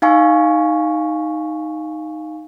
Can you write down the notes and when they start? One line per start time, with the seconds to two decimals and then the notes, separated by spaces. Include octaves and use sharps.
0.02 D#4 F5 G#5 C#6